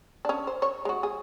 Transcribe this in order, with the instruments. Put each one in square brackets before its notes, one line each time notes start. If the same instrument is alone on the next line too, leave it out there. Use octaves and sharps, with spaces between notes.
[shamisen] C#4 D4
C5
C#5
G#3 F#4
G#4